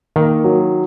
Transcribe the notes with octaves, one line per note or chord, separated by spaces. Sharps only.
D#3 A#3
F#3